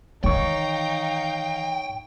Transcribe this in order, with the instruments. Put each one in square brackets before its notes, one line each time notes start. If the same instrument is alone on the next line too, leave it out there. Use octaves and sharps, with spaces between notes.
[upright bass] D#3 E3 [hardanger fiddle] D#4 F5 [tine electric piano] C#5 C#6 [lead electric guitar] G5